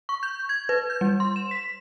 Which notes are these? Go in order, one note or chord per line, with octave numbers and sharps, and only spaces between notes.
C#6
G6
G#6
B4
G6
G3
C6
E7
B6